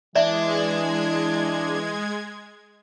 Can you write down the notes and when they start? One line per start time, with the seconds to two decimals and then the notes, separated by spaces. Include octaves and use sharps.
0.16 E3 G#3 D4 D5 E5 G#6